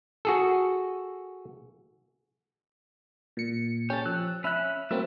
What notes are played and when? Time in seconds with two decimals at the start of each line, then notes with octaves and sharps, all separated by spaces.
0.25 F#4 G#4 A4
3.37 A#2 C#7
3.90 C#4 G4 A4
4.06 F3 E6 F#6
4.44 C#4 E5 B5 E6 F#6
4.91 F#3 A3 A#3 C4 E4 E5